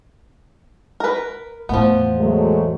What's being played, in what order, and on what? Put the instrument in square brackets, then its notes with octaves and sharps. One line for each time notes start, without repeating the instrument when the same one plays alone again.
[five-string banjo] A#4 B4
[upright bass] E2 A2 [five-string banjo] F3 B3
[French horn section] F#3 G#3 A3